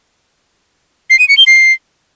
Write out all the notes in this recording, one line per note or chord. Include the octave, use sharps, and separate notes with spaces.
C7
D#7
C#7
G7
C7